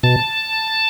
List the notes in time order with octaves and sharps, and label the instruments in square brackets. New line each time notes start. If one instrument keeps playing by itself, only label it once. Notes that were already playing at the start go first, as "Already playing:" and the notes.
[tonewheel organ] B2 A5